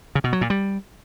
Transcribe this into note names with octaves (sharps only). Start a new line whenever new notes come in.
C#3
B2
F#3
A#2
G3